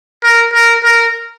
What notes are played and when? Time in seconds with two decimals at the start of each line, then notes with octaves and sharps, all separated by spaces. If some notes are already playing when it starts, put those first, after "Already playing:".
0.23 A#4
0.53 A#4
0.84 A#4